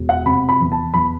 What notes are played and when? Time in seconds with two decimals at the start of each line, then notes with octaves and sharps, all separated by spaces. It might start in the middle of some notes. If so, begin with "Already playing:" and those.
Already playing: E1
0.09 F#5
0.26 C3 B5
0.49 B5
0.60 E2
0.72 A5
0.94 E2 B5